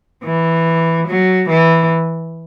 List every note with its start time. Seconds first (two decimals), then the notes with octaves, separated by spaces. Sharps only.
0.24 E3
1.07 F#3
1.49 E3